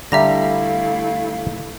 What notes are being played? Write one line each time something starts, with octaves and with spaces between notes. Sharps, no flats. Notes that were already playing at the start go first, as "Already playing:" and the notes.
D3 G3 A3 E4 E5 F5 A#5 A#6